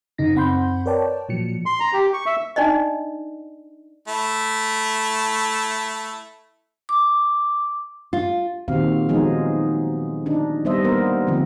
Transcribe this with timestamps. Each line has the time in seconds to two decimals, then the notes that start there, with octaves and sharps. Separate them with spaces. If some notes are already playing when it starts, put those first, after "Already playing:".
0.18 F#2 C#3 D#4 A#6
0.35 F#2 C4 F#5 B5 C6 G6
0.86 A#4 B4 C#5 D5 G5 A5
1.29 A#2 F3 F#3 C#7
1.66 C6
1.80 A#5
1.93 G4
2.14 C#6
2.26 E5
2.56 D4 D#4 D5 D#5
4.08 A3 E4
6.89 D6
8.13 F4
8.68 A#2 D#3 C4 F#4 G4 F5
9.09 F3 F#3 G#3 B3 D#4 G#4
10.26 D4 D#4
10.65 G3 B3 C5 D#5 E5
10.84 A#3 B3 A#4 C5
11.27 D3 F3 C4